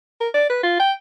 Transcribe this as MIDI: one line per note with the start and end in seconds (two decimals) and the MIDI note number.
0.21 0.29 70
0.34 0.46 74
0.50 0.58 71
0.63 0.78 65
0.80 0.92 79